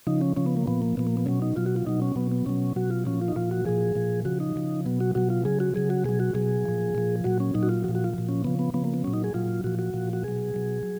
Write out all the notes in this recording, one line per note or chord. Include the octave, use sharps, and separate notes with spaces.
C#3 F3 D#4
C#4
C#3 F3 C#4
B3
A#3
A#2 F3 B3
A#3
A#2 F3 B3
A#3
B3
B2 F#3 C#4
D#4
B2 F#3 F4
F#4
F4
B2 F#3 D#4
C#4
B2 F#3 B3
B3
B2 F#3 C#4
B2 F#3 F#4
F4
A#2 F3 C#4
F4
D#4
A#2 F3 F4
F#4
A#2 F3 G#4
A#2 F3
C#3 F3 F#4
D#4
C#3 F3
B2 F#3 B3
F#4
B2 F#3 F#4
F4
C#3 F#3 G#4
F#4
C#3 F#3 G#4
F#4
B2 F#3 G#4
F#4
B2 F#3 G#4
A#2 F3
A#2 F3
A#2 F#3 F#4
C#4
A#2 F#3 D#4
F#4
F4
A#2 F3 F#4
F#4
F4
A#2 F3
C#4
C#3 F3 B3
B3
C#3 F3 B3
A#3
B3
A#2 F#3 C#4
D#4
G#4
A#2 F#3 F4
A#2 F3 F#4
F#4
A#2 F3
F#4
B2 F#3 G#4
B2 F#3
F#3